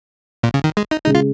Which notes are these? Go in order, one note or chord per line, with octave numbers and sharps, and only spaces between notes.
A#2
C#3
D#3
G#3
D#4
C#3 G#3 D#4
F4